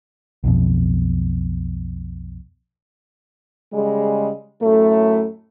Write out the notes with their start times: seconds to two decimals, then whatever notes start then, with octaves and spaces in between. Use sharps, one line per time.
0.44 B1 F2 B2
3.73 C#3 G3 G#3
4.62 F#2 A2 A3